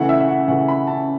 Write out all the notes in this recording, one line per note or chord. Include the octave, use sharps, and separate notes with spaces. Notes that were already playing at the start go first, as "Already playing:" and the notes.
Already playing: C#3 E3 A3 F#5
E5
E5
F#5
C#3 E3 A3 F#5
B5
A5